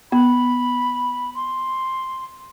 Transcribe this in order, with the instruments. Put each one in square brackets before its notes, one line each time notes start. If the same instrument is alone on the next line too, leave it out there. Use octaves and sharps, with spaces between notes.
[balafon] B3 [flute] B5
[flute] C6